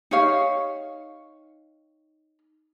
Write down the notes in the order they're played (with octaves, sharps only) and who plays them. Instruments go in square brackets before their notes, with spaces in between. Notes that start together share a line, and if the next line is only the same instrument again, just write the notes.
[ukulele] D#4 G4 C#5 F5